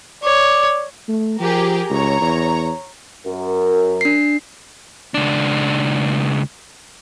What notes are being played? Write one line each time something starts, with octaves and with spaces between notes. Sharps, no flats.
C#5 D5
A3
F3 G4 G#4 A#4
C#2 C#5 A#5
E2
F#2 A#4
D4 C7
C#2 D4